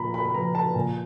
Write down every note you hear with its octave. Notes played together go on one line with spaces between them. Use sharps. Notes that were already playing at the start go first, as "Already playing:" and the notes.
Already playing: A#2 F3 A#5 B5
B5
B5
F3 A#5
A5
A#2 G#5